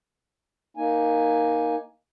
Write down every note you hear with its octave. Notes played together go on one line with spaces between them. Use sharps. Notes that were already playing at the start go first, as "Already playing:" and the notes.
A#3 D#4 G#5